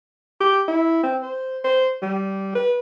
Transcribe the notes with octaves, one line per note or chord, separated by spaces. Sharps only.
G4
E4
C4
C5
C5
G3
B4